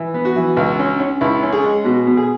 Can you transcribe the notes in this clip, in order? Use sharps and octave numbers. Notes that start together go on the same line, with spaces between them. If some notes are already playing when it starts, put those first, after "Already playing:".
Already playing: E3
B3
F#4
E3
C#2
C#4
C#4
C#2 E4
C#4
G#4
G#3
B2 F#4
B2
G#4